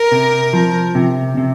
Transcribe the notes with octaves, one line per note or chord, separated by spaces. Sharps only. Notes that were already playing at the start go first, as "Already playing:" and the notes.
Already playing: A#4
C3
F3
C3
C3